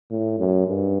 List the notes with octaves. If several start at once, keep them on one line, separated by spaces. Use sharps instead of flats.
A2
F#2
G2